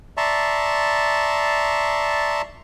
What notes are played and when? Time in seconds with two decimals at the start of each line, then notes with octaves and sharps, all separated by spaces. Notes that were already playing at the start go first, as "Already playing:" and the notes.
0.17 D5 E5 A5 A#5 C6 C#6